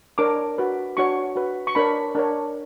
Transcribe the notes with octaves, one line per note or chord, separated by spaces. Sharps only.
D4 A#4 C#5 D6
F#4 B4
D4 F#4 C#5 C#6
F#4 B4
C#6
D4 A#4 C#5 B5
D4 A#4 C#5